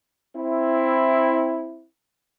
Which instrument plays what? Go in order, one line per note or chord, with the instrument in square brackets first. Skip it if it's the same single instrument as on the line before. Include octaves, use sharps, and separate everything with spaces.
[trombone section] C4 E4